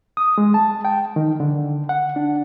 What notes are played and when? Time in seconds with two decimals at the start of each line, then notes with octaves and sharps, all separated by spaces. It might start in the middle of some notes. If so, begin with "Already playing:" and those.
0.17 D#6
0.38 G#3
0.54 A5
0.85 G5
1.16 D#3
1.40 D3
1.89 F#5
2.16 D4